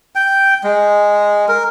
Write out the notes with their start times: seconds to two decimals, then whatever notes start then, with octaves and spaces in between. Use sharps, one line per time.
0.15 G5
0.64 G#3
1.48 A#4